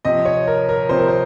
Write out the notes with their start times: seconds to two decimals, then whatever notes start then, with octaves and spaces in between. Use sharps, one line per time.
0.05 C3 F3 D#5
0.25 C#5
0.47 A#4
0.69 A#4
0.89 C3 F3 C5
0.99 A#4
1.08 C5